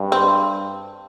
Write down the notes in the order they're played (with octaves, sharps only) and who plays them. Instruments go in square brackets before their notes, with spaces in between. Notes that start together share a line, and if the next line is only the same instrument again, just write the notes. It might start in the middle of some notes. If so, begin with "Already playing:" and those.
Already playing: [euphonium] G2
[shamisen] C4